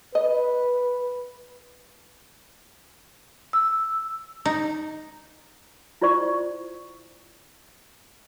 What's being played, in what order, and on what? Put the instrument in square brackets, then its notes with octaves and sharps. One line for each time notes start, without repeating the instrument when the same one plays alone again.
[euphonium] B4 [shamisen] D#5
[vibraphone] E6
[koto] D#4
[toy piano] E4 F4 C5 D5 C#6